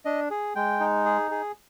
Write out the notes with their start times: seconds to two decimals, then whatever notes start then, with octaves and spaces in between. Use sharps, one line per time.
0.05 D4 D#5
0.30 G#4
0.55 G#3 G5
0.80 D#4
1.05 G#4
1.31 G#4